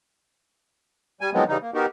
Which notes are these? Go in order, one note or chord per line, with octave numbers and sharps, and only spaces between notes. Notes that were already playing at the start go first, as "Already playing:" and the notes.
G3 G#5
D#3 F3 F#3 G#3 B3 C4
C#3 E3 G3 D#4
A#3
B3 D#4 F#4 G4 A#4